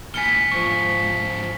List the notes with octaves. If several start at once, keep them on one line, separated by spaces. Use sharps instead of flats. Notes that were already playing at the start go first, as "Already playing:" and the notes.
A#2 E3 G#5 F6 B6 C#7 G7
E2 G#2 F3 C#6